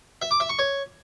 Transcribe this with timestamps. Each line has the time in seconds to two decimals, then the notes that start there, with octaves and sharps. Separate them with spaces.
0.22 E5
0.31 D6
0.40 E5
0.49 C#6
0.59 C#5